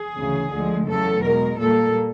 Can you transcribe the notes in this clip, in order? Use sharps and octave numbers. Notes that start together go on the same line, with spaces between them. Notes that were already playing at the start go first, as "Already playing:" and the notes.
Already playing: G#4
D2 C#3 E3
D2 D3 F3 G#3
E2 C#3 F#3 A3 A4
B2 G#3 A#4
A#2 G3 A#3 A4